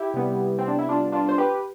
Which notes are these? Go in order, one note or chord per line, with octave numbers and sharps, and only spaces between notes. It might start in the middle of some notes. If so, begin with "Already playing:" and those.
Already playing: E4 G4
C3 G3 B3
C4
D4
E4
D4 F4
D4 F4
C5
G4 B4